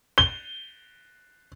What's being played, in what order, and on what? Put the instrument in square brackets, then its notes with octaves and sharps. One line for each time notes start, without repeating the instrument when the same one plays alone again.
[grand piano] G7